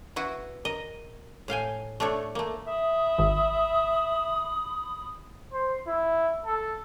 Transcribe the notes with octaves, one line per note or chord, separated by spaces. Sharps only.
E4 F#4 B4
A#4 D#5
A2 F5 G5 G#5
A3 D4 A4 C#5
A3 A#3
E5 B5 D#6
G#1
C5
E4
A4